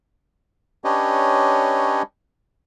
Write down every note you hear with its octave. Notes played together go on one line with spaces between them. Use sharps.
C#4 D4 G4 B4 C#5 D#5